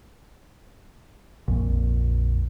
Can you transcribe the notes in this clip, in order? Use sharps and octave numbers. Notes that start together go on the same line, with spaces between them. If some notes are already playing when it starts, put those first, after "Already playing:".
A#1 F2